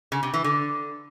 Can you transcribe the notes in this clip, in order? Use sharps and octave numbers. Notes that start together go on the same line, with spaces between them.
C#3
C3
E3
D3